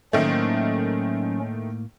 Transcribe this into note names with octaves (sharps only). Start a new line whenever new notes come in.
A2 D#3 F#3 A3 A#3 C#4 C5